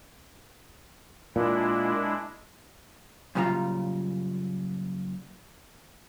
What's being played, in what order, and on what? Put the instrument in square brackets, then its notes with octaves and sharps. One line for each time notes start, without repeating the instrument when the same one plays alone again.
[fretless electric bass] A#2 [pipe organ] G#3 D4 E4
[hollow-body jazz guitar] F#2 A#2 C#3 G3 F4 A#5